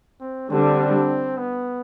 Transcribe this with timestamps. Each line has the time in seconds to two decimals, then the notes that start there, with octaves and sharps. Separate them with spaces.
0.21 C4
0.50 D3 G3 C4 D4
1.38 B3